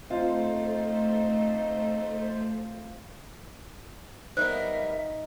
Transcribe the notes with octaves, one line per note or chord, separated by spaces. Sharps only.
A3 C4 D#4 F4 C5
G3 B3 D#4 A#4 C5 E5